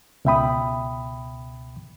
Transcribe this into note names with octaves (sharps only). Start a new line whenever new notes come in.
C#2 B2 E5 G5 B5 D#6